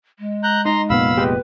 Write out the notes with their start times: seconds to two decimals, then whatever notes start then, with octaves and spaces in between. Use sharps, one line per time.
0.19 G#3
0.43 A#5 F#6 G6
0.65 D#4 A#5 C6
0.90 F1 A#2 B3 F5 B5 E6
1.17 G#3 G4 B4